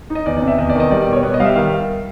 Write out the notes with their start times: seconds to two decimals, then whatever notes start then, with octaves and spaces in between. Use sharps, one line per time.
0.10 D#4
0.15 D#5
0.26 E2 D5
0.37 D5
0.42 C3
0.48 E5
0.58 E2 D#5
0.69 D5
0.75 D#3 D#5
0.91 G3 D5
1.02 B2 D5
1.13 C#5
1.23 B3
1.34 D#5
1.40 G3 E5 F5
1.56 D#3 F5